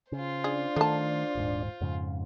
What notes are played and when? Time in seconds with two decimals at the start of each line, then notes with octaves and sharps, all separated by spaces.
0.12 C#3 F4 C5
0.44 D4 G#4 D5
0.76 D3 D#3 A3 A5
1.35 D#1 G#2
1.81 F2 G#2 C#3